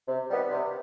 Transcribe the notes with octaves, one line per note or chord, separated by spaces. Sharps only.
C3
D#3 G3 B3
C3